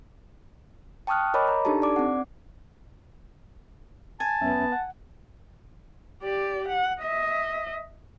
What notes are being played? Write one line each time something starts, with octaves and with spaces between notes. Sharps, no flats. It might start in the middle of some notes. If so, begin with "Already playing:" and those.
G5 A5 C#6 D#6 F6 F#6
A#4 C#5 D#5 B5 D6
A#5
D4 D#4 G4 A4 A5
D5 D6
C4 F#5
G#5 A5
F#2 B3 C#4 E5
F#5
G4 D5
F#5
D#5 E5